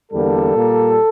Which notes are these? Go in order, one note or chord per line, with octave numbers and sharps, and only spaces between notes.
E2 D3 G3 A#3 A4
A#2 G3 A#3